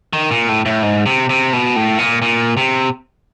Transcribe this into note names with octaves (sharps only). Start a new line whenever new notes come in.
D#3
A#2
A2
A2
G#2
C3
C3
B2
A2
A#2
A#2
C3